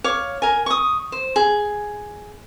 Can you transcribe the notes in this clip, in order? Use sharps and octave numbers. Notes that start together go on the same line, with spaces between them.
C#5 F5 D6
A#4 G#5
C#6 D#6
C5
G#4